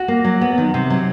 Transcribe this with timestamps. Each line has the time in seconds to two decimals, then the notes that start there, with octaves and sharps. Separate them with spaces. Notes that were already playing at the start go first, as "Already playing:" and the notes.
Already playing: F#4
0.08 A#3
0.24 F#3
0.41 B3
0.58 D#3
0.74 C3
0.90 F#3